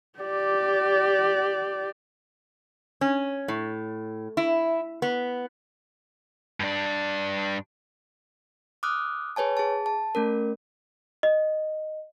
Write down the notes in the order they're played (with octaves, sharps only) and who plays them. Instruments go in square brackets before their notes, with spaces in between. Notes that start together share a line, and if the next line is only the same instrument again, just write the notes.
[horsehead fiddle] G4 D5
[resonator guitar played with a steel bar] C#4
A2
E4
B3
[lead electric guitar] G2 D4
[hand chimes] D6 D#6 F6 F#6
G#4 B4 C#5 G#5 A5
G#4 A5
A5
A3 C#4 A#4
[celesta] D#5